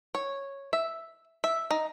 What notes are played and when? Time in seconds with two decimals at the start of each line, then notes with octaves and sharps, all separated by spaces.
0.15 C#5
0.73 E5
1.44 E5
1.71 D#4